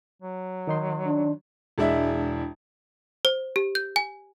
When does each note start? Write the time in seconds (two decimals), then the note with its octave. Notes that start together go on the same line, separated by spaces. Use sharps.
0.22 F#3
0.67 D#3 D#4 C6
1.06 D4
1.78 E1 G#3 D4 E4 E5
3.25 C5
3.56 G4
3.75 G6
3.96 G#5